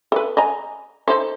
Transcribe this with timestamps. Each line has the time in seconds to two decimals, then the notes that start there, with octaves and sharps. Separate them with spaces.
0.12 A4 B4
0.37 D#5 G#5 A#5
1.08 D#4 A4 C5